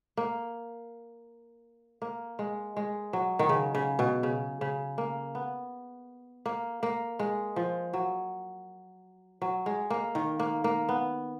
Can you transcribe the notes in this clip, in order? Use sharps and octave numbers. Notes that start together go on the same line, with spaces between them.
A#3
A#3
G#3
G#3
F#3
D#3
C#3
C#3
B2
C#3
C#3
A#3
B3
A#3
A#3
G#3
F3
F#3
F#3
G#3
A#3
D#3
A#3
A#3
B3